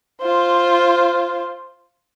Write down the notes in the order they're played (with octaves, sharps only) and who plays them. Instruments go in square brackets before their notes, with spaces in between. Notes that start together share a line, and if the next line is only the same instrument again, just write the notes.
[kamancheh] F4 C5